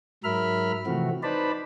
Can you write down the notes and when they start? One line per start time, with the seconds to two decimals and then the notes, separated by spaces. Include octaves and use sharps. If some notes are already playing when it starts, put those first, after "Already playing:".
0.24 G#2 F#3 A#4 E5 B5 F6
0.86 C3 E3 F3 A3 C4 F#4
1.23 D#4 B4 C5 D5 A5 B5